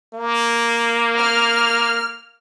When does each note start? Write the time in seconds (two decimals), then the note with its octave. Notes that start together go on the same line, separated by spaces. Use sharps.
0.14 A#3
1.18 F6